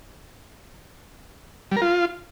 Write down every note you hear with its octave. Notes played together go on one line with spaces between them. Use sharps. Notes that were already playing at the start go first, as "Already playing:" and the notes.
G3
A#4
F4